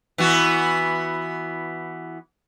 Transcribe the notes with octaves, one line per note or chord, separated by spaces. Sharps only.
E3 B3 F#4